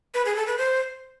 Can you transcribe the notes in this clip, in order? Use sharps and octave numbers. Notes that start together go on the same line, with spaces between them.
B4
G#4
A4
B4
C5